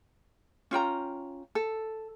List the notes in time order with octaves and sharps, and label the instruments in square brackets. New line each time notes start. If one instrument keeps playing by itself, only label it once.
[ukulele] C#4 F4 G5 A#5
A4